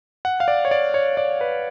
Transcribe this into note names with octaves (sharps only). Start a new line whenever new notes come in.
F#5
F5
D5
C#5
D5
C#5
D5
B4